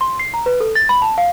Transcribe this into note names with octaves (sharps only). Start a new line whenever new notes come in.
C6
C7
A#5
B4
A4
A6
B5
A5
F5